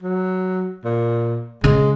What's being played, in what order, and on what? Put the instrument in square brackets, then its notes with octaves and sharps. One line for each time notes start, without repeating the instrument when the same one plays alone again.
[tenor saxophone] F#3
A#2
[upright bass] C#3 [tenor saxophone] G#3